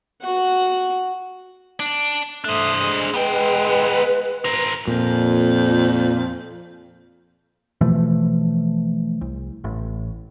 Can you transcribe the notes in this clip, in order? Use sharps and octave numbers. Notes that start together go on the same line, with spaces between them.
F#4 F#5
D4
A3 D4 C5 D#6
G#3
B3 B4 G5
A#4 C5
F2 A#2
B2 E3 F3 A3
C2
A1 A2